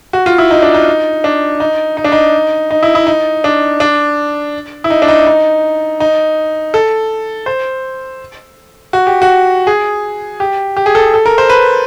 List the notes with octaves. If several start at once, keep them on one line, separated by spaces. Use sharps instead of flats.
F#4
F4
E4
D#4
D4
D#4
D4
D#4
D#4
D4
D#4
D#4
E4
E4
D#4
D4
D4
E4
D#4
D4
D#4
D#4
D#4
A4
C5
F#4
G4
F#4
G#4
G4
G4
G#4
A4
A4
A#4
C5
B4